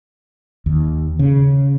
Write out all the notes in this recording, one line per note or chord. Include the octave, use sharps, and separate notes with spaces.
D#2
C#3